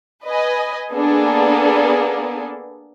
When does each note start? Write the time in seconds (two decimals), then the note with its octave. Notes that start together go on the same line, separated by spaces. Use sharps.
0.25 B4 D#5 G#5
0.93 A#3 B3 D4 G#4 A4